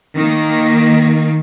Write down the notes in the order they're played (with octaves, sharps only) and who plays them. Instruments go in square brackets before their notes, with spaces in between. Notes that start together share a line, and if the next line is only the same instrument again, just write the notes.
[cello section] D#3 A#3